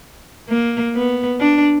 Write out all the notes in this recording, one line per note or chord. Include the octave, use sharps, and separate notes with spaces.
A#3
B3
D4